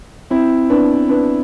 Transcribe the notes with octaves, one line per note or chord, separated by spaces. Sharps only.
C4 E4
B3 D4
B3 D4